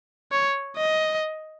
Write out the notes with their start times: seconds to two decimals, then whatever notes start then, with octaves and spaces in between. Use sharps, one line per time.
0.32 C#5
0.77 D#5